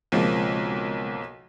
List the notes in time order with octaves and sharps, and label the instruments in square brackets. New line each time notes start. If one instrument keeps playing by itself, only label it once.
[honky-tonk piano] B1 F3 A#3 [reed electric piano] C#3 G#3 C4